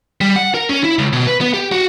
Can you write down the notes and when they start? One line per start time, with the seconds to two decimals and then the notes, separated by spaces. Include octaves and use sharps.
0.21 G3
0.36 F#5
0.54 A#4
0.69 C#4
0.83 E4
0.99 C#2
1.13 B2
1.27 B4
1.41 B3
1.54 G4
1.72 F#4